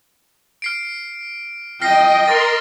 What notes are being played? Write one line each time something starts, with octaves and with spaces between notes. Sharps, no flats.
F6 C7 D7
D#5 G5 F6 A#6 C7
A#4 C6 D6 A6 A#6